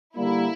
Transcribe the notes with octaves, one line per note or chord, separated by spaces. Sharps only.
D3 G3 A#3 E4